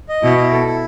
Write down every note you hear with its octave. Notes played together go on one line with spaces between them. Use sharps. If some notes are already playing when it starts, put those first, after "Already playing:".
D#5
B2 E4
E4
A4
E4